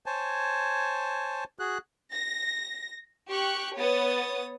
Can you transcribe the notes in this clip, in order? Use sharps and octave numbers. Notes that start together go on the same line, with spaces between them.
C5 C#5 G#5 A5
F#4 G#4 F#6
A#6
G4 C#6 F#6
B3 C#5 D#6 A6